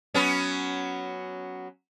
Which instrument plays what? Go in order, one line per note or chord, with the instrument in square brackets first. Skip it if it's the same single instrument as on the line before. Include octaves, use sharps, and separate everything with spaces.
[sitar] F#3 B3 C#4